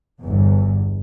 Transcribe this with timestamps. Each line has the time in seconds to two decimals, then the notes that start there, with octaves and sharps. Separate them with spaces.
0.22 G1 E2